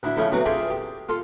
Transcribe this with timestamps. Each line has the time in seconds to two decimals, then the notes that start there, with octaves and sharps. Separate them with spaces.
0.03 D2 D4 E4 E5
0.17 C#3 F3 A3 E4 A4
0.32 C3 E3 F#3 C4
0.45 F4 G#4 A4 D5 E5 G5
0.70 G4
1.09 F4 A4 C6